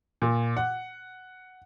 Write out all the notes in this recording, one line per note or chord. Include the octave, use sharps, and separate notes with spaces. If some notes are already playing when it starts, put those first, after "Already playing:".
A#2
F#5